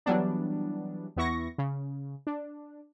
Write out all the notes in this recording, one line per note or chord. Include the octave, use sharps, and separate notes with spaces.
E3 F#3 G3 B3 D4
E2 B3 E4 C#6 A#6
C#3
D4